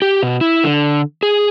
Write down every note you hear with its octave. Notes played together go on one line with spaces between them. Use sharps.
G4
B2
E4
D3
G#4